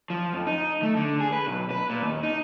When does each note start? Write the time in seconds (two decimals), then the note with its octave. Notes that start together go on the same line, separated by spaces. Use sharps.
0.10 F3
0.33 F2
0.47 D#4
0.83 A3
0.96 D3
1.20 G#4
1.32 B4
1.47 B1
1.71 B4
1.90 A#2
2.02 D#2
2.23 D#4